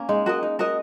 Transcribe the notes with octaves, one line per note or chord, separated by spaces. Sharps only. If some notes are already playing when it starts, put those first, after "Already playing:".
Already playing: A#3 C#4
G#3 D#4
F#4 A#4 D#5
D#4
F#4 A#4 D#5